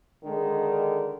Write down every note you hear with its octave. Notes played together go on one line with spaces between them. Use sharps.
D3 D#3 G#3 D4